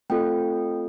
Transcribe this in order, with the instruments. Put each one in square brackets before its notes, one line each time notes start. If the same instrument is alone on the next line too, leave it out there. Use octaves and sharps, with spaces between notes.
[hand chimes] A3 C4 F4 A4 G5